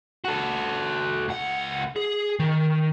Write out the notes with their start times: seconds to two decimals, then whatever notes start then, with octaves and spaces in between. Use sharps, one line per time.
0.25 F#4 A4
1.28 C#2 F#5
1.96 G#4
2.39 D#3